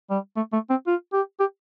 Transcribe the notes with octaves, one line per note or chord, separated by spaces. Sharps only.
G3
A3
A3
C4
F4
G4
G4